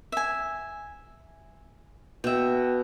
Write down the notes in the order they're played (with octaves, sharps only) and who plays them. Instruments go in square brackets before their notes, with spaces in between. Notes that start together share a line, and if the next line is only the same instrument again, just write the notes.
[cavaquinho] E5 G#5
[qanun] B2 [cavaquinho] E5 G5